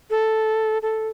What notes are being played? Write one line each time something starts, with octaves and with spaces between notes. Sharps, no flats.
A4
A4